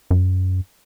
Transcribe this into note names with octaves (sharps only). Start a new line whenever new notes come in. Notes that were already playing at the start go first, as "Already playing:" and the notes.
F#2